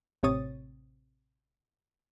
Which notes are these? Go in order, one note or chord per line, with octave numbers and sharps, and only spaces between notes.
A1 C3 C#5 D#6 A6